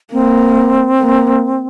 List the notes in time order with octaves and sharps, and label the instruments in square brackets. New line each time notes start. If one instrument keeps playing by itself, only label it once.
[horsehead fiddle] A#3 [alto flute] C4
[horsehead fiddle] A#3